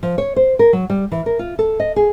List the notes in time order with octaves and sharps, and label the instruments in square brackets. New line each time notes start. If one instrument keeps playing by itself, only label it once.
[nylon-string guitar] F3
C#5
C5
A#4
F#3
G3
E3
A#4
F4
A4
D#5
G#4